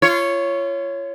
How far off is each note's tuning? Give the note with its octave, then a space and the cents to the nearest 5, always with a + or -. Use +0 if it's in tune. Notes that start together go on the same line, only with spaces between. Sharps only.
F4 -30 C#5 +0